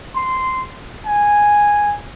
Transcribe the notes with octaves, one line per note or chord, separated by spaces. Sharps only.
C6
G#5